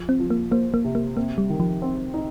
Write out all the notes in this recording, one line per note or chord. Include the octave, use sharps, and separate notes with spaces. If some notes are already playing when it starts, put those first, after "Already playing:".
Already playing: F3
C4
F3
A#3
A#3 C5
A#3
C3
A#3
A#3 C4
G3
D#3
F3
C4
D#4